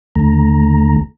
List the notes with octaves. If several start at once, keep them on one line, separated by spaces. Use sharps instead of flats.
D#2 D3 A3 A#5